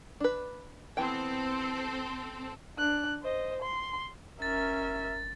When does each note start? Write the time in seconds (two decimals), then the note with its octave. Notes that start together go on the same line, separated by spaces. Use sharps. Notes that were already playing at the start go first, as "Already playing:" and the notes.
0.20 D4 B4
0.97 E3 B3 C4 A4 G5
2.78 D4 F#6
3.23 C5 D#5
3.62 C6
4.42 F#1 C#4 A#4 E5 A6